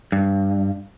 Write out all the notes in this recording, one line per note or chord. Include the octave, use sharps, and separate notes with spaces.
G2